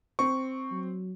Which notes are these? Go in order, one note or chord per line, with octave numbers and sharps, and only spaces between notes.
C4 C#6
F#3